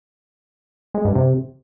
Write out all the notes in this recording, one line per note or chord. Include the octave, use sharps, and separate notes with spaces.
G#3
G2
C3